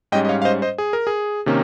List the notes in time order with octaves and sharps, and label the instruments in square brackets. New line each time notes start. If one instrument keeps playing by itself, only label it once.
[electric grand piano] G#2 G3 C#4 D#5 G5
D#5
C#5 F5
F5
C5 D#5
C5 D#5
G#4
A#4
G#4
C3 D#3 A#3 C#4